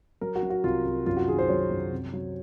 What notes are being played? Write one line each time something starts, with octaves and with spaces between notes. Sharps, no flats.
F#3 A#4
F#4
F#3
F#4
C2 F4
C2
F#2 F4
F#4
D#3 G#4
C5
F#3 C#5
F#2
C3
F#3